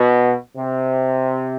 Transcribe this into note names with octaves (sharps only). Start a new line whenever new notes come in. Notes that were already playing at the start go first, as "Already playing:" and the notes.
Already playing: B2
C3